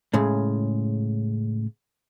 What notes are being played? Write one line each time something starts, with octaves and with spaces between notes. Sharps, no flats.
A2 C#3 G#3